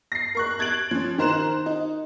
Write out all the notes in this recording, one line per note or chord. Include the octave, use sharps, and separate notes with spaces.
A#6 C7
A#4 C#6 F#6
F#6 G#6 A6 D7 F#7
F3 C#4
D#3 A#4 C5 A#5 F#6 E7
D#4